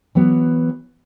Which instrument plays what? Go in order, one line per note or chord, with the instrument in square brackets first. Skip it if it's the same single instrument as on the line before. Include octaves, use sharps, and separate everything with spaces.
[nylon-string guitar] E3 F#3 B3